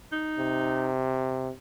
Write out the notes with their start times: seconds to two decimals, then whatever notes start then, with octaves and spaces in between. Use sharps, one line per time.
0.12 D#4
0.39 C3